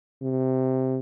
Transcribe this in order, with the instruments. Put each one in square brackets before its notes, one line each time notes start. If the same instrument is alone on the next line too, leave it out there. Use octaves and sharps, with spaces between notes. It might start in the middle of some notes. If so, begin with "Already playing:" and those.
[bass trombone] C3